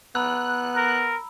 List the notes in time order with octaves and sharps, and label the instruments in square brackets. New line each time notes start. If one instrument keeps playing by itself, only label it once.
[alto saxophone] B3 [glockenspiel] A#5 B5 E6 [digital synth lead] F#6
[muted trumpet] A#4